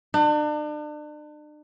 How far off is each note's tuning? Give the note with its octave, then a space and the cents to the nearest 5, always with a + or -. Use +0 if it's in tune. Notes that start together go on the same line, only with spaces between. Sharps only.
D4 +40